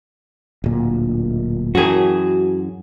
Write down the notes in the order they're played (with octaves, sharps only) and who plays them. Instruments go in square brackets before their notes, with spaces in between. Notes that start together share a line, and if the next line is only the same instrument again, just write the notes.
[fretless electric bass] D1 A#2
[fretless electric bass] F#2 E3 F#3 [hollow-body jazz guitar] F#4 G#4